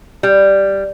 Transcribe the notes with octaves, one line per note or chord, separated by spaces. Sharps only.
G3